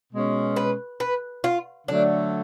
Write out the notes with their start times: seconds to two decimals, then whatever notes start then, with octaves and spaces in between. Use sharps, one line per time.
0.13 B2 G#3 C#4
0.56 B4
1.00 B4
1.44 F4
1.88 D3 F#3 A3 D4